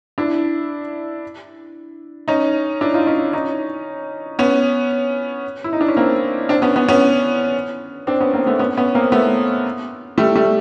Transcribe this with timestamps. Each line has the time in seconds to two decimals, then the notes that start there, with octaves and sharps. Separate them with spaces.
0.18 D4 E4
2.28 C#4 D#4
2.81 D4 E4
2.94 D#4 F4
3.07 C#4 D#4
3.33 C#4 D#4
4.39 B3 C#4
5.64 E4
5.73 D#4
5.81 D4
5.88 C#4
5.97 A#3 C4
6.49 C4 D4
6.62 B3 C#4
6.76 B3 C#4
6.89 B3 C#4
8.07 C4 D4
8.20 B3 C#4
8.34 A#3 C4
8.46 A3 B3
8.59 B3 C#4
8.77 B3 C#4
8.95 A#3 C4
9.12 A3 B3
10.18 G3 A3
10.35 G3 A3